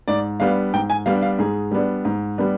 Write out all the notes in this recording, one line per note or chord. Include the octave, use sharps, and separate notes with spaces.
G#2 D5
G3 B3 D4 F5
G#2 G5
G#5
G3 B3 D4 F5
F5
G#2 G#4
G3 B3 D4
G#2
G3 B3 D4